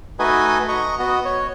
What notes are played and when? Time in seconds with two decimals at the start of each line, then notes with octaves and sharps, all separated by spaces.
0.19 A3 D#4 F#4 B4 D#5 G#5
0.68 D#5 A#5 C#6
0.99 B3 F#4 D#5
1.25 C#5